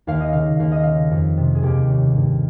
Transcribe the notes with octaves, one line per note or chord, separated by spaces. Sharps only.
D#2 F5
D#5
C#3 F5
D#2 F5
D#5
C#3 F5
F2
C3
G#4
D#2 G4
C#3
G2